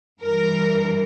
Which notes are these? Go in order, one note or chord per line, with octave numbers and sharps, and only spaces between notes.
G2 E3 A#4